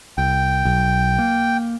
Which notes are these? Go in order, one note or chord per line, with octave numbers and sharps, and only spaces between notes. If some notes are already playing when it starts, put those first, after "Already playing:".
C2 G5
B1
A#3